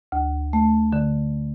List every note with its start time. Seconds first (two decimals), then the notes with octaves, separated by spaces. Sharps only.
0.12 D2
0.53 A3
0.93 D3